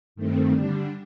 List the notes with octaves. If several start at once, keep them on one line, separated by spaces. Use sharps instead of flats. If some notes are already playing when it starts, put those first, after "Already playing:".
G2 D#3 A3 C4
D3 G3 D4